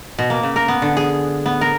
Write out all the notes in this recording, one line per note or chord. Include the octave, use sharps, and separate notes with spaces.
B2
A#3
C#3
A#4
B3
D3
G#4
B3
A#4